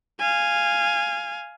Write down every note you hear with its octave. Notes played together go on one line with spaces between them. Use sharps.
F5 G#5